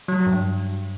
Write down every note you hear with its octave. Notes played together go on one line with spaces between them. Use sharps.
F#3
G2